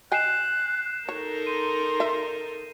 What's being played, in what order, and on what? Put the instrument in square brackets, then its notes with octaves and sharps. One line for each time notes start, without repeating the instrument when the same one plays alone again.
[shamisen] D#5 G5 G#5 [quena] F#6 [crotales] G6 C7 E7
[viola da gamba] D#4 A4 A#4 [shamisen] C#5
[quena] C6 [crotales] D#7
[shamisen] E5